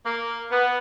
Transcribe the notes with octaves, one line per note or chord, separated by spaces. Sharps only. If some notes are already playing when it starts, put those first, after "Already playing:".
A#3
B3